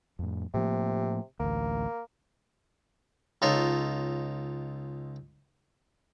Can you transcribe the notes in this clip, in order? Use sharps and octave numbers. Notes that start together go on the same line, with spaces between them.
F2 A2
A2 C3 F3 A#3
A1 D2 A#3
C#2 D#4 F4 A4 C#5